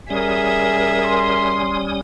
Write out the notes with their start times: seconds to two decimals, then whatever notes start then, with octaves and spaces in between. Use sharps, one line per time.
0.10 G3 C#4 G#4 A#4 E5 D#6
1.05 C6